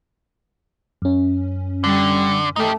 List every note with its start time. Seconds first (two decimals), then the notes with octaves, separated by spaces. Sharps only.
1.02 F#2 C#4
1.84 D3 G3
2.56 A3 D#4 G4